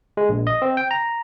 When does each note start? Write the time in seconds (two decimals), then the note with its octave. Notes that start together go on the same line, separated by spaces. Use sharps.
0.17 G#3
0.29 A#1
0.47 D#5
0.62 C4
0.77 G5
0.91 A#5